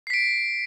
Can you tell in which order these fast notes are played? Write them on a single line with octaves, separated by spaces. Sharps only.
C7 B6 D7